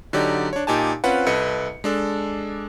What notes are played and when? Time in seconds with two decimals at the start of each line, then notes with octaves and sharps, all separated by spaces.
0.13 D3 F#3 D#4 G4 D5
0.53 D4 C#5
0.67 A#2 D#4 G4 G#5 A5
1.04 C4 C#4 F4 B4 F#5
1.26 C2 A4 B4 D#5 C#7
1.84 G#3 D4 A4